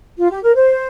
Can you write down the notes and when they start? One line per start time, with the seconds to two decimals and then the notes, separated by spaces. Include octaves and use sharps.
0.19 F4
0.31 G4
0.43 A#4
0.55 C5